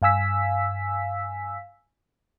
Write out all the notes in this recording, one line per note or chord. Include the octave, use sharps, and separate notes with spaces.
G2 F5 G#5 E6 B6